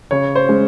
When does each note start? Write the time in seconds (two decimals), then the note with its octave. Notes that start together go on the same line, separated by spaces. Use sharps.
0.11 C#3 C#5
0.36 C5
0.49 G#3 C#4